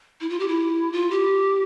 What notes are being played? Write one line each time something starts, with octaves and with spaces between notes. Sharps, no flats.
E4
F4
G4
E4
F4
G4